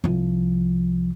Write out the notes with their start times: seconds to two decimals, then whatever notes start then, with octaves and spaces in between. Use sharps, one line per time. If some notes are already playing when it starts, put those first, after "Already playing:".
0.04 C2 F3